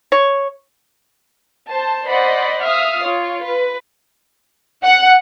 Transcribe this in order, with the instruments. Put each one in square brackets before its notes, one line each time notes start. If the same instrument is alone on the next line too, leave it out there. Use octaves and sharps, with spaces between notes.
[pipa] C#5
[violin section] C5 A5
C5 D5 D#5 F#5 B5
E5 F5 D#6 F6
F4 C#5
B4
F#5